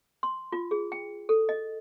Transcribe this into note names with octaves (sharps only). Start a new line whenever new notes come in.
C6
F4
G#4
G5
A4
D#5